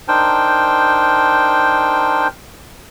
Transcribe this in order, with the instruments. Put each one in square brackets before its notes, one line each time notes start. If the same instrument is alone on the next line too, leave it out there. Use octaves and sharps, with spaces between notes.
[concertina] D4 D#4 A#4 C5 G5